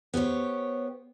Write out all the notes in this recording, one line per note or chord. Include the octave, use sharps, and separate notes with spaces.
B3 G4 C5 C#5